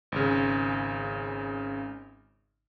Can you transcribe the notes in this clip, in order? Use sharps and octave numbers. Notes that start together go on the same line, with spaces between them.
G#1 C#3